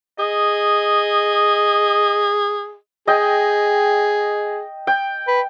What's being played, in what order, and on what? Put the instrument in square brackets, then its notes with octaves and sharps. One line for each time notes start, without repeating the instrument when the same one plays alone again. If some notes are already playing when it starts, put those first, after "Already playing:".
[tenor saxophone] G#4 [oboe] D#5
[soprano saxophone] G#4 [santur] D#5 G5
[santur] G5
[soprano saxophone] B4